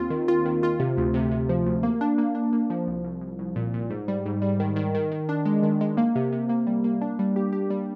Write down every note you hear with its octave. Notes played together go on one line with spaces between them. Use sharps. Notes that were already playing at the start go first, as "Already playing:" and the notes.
Already playing: D#2 C4 F4
D#3
F4
D#3
F4
C3
D2
C3
C3
F3
D2
A#3
D4
A#3
D4
A#3
F3
C2
C2
C2
C2
A#2
A#2
G#2
G3
G#2
G3
D#3
D#3
D#3
D#3
D4
G#3
D#3
G#3
A#3
C3
C3
A#3
G3
A#3
D4
G3
G4
G4
G3